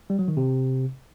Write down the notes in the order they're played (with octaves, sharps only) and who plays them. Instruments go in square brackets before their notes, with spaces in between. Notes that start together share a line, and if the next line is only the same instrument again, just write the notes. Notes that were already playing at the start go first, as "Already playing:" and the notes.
[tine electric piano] G3
F#3
D#3
C3